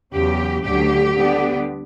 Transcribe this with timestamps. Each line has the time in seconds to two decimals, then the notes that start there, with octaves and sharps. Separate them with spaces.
0.13 E2 C#3 F#3 G4
0.64 D2 D3 F#3 G4
1.16 D3 G3 B3 D4